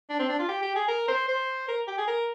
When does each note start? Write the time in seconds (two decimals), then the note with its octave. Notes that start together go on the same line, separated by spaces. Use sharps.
0.10 D4
0.19 C4
0.29 D4
0.39 F4
0.48 G4
0.62 G4
0.75 G#4
0.88 A#4
1.08 C5
1.28 C5
1.68 A#4
1.88 G4
1.98 G#4
2.07 A#4